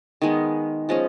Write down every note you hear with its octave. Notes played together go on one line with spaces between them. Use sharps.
D#3 G#3 B3
F3 G#3 C#4